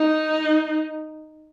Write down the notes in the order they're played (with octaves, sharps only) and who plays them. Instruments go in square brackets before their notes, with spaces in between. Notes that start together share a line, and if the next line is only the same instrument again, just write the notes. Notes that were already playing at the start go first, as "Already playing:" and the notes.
Already playing: [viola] D#4